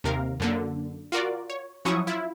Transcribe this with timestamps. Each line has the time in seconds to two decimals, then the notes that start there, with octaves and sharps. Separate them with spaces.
0.04 D#2 C3 A#4 F5
0.40 F#2 D3 A#3
1.12 F4 F#4 A#4 D5
1.50 C#5
1.85 F3 F#3 C#4 E4 C#6 D#6
2.07 E4 F4